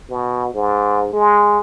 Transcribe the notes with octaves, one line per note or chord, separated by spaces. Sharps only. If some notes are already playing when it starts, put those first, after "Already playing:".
B2
G#2
G#3